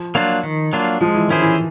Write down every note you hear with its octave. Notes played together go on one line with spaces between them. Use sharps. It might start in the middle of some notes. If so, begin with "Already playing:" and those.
Already playing: F3
F#3 A#3 D4 F4
D#3
F#3 A#3 D4 F4
F3 G#3
E3
D#3 C#4 E4 G#4 C5
E3